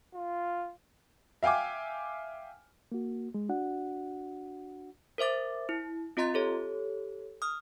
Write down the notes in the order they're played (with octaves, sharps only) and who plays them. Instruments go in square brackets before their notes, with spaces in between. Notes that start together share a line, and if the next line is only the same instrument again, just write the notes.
[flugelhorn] F4
[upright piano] E5 F5 G5 G#5 D6
[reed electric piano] A#3 F#4
G#3
D4 F#4 F#5
[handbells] A#4 C5 E5 D6 A6
E4
C4 F4 D#5 A#5 C6 A6
G4 A4 C#5
D#6 F6